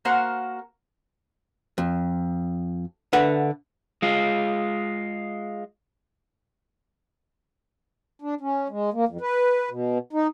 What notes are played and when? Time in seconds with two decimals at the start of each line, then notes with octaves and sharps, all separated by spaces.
0.05 A#3 F#4 A#4 C5 F#5
1.78 F2
3.13 D3 B4 E5 F#5
4.02 G#3 F4
8.22 D4
8.41 C#4
8.69 G#3
8.93 A#3
9.08 F2
9.21 B4
9.70 B2
10.13 D#4